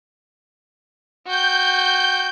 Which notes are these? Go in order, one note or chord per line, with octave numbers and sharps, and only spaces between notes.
F#4 G5 G6